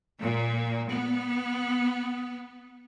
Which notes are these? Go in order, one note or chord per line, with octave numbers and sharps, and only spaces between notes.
A#2
B3